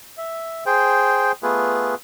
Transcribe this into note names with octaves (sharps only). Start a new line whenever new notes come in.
E5
G#4 C5 G5
A3 B3 F4 G#4 B4